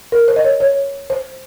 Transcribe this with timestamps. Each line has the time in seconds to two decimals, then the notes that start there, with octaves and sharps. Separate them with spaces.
0.12 A#4
0.28 C5
0.36 D#5
0.44 C#5
0.60 C#5
1.10 C5